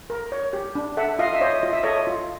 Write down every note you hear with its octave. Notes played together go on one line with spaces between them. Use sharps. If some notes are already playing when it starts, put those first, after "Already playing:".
A#4
C#5
G4
D4
A4 E5 F#5
F4 D#5 F5
E5
C5 C#5 D#5
F4 D#5
E5
A4 C#5 D#5
F4